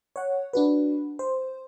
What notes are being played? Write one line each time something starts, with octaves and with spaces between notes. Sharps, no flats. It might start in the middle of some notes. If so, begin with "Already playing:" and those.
C#5 F#5
D4 F#4 B4
C5